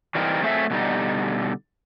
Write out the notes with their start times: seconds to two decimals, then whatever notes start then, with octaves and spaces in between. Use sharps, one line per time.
0.15 E3 G3 C4 D#4 A#4
0.42 F#3 A3 C4 G#4 D5 E5
0.70 B2 D3 G3 D#4